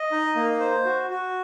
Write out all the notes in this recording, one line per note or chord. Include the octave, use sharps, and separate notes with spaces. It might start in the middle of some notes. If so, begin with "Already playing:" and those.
Already playing: D#5
D#4
A#3
C5
F#4
F#4